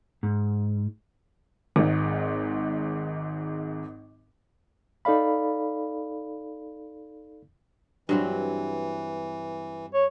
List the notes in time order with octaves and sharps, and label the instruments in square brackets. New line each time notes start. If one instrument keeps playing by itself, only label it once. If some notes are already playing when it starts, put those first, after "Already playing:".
[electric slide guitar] G#2
[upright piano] G#1 G#2
[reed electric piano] D#4 A4 D5 F5 B5
[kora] G2 F#3 C4 [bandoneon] E3
[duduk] C#5